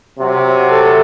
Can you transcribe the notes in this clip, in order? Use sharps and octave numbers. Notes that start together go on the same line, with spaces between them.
C3 F#3
A4